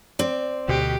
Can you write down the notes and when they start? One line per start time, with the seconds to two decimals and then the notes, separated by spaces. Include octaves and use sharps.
0.19 C4 D5
0.68 D2 B2 G4